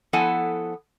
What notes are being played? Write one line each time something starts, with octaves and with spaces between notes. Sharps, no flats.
F3 B3 E4 A4 F#5 G#5